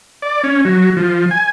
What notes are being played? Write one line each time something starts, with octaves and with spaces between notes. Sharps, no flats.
D5
C#4
F#3
F3
G#5